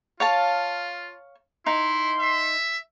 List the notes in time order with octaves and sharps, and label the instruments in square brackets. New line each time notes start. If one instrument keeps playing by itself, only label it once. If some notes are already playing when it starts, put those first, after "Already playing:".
[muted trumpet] F4 [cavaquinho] C#5 F5 A5
[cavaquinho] D#4 [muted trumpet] E4 [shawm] C6
[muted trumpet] E5